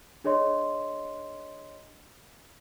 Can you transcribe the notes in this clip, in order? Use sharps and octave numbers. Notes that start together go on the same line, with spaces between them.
D4 G#4 C#5 D#5 C6